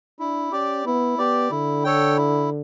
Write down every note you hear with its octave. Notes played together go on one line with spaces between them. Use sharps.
D4 E4
C#4 G4 D5
B3 E4
B3 G4 D5
D3 E4
A4 C#5 G5
E4